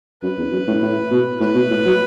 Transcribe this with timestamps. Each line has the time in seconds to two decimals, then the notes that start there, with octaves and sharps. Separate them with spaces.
0.22 F#2 B4
0.38 E2
0.52 F#2
0.67 A2
0.82 A2
1.11 B2
1.40 A2 B4
1.55 B2
1.70 A2
1.85 F#3